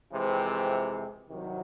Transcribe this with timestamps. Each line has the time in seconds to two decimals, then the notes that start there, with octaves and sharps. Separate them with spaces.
0.13 F2 C3 E3 G#3 C4
1.29 C2 C3 D#3 F#3